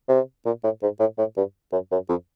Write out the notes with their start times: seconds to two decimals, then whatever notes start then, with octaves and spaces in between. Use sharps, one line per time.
0.09 C3
0.46 A#2
0.64 A2
0.83 G#2
1.00 A2
1.18 A2
1.37 G2
1.72 F#2
1.92 F#2
2.09 F2